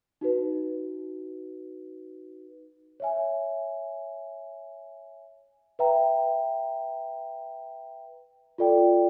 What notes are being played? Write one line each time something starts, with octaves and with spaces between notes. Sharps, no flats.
D#4 F#4 B4
C#5 E5 G#5
B4 E5 G5 A#5
F4 A4 D5 G5